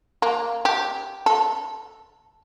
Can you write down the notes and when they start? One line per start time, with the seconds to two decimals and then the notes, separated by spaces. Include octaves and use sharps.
0.22 A#3
0.65 G4
1.26 A4